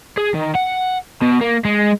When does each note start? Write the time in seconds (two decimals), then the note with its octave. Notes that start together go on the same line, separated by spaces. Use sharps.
0.17 G#4
0.34 D#3
0.55 F#5
1.22 B2
1.41 A#3
1.65 G#3